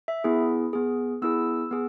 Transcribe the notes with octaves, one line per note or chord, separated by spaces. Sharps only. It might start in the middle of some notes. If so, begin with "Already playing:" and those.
E5
B3 E4 G#4
B3 G#4
B3 E4 G#4 E6
B3 G#4